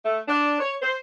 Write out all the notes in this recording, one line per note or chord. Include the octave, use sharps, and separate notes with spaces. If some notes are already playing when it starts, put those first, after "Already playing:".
A3
D4
C#5
C5